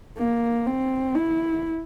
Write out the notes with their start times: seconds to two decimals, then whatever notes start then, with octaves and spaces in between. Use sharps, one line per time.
0.18 A#3
0.67 C4
1.16 E4